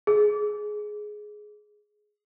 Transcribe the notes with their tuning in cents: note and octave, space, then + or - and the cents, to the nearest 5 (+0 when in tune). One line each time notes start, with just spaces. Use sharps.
G#4 +10